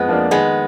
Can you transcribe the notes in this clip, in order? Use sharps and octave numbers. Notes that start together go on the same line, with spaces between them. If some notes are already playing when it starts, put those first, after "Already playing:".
Already playing: F2 G#3 B3
F3 A#3 D4
D#3 G#3 B3